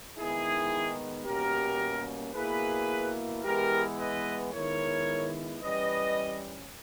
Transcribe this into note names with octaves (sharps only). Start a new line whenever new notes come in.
D#3 G#3 B3 D#4 E4 G#4
B2 G3 A#3 C#4 G4 A#4
B2 A#3 E4 G#4 B4
E3 G#3 B3 E4 G4 A#4
B4 D#5
D#3 G#3 B3 E4 A#4 C#5
E3 G3 C#4 B4 D#5